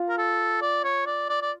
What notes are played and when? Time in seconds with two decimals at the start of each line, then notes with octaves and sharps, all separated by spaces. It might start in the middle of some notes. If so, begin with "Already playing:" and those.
Already playing: F4 F5
0.09 A#4
0.18 A4
0.61 D5
0.84 C#5
1.06 D5
1.29 D5
1.42 D5